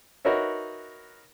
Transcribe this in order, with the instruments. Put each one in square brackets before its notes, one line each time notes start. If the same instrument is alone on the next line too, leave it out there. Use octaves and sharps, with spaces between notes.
[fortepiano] D#4 F#4 A#4 B4 C#5 E5